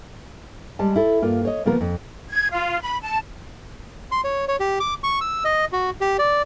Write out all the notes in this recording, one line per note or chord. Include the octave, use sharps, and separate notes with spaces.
G3 G#3 A5
E4 A4
G2 A#3 F4
C#5 D#5
C#3 F3 A#3 B3 A#4
F2
G#6
F4
B5
A5
C6
C#5
C#5
G4
D6
C#6
E6
D#5
F#4
G4
D5